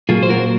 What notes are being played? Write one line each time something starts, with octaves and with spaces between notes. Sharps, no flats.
A#2 F#3 A#3 F4 G#4
C5
F#4 A#4